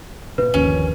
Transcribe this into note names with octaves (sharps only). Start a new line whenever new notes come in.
A#2 C#3 B4
G1 D#2 F3 C#4